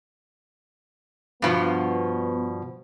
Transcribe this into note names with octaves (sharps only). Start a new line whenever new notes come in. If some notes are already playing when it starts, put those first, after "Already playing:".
G2 B2 F3 B3